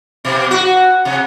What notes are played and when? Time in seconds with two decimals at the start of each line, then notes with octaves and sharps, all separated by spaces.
0.25 B2
0.51 F#4
1.05 C3